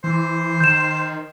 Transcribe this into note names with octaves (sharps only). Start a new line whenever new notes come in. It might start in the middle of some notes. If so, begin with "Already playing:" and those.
E3 C5
D#3 G6 E7